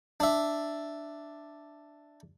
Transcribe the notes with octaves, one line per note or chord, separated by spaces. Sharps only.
D4 E5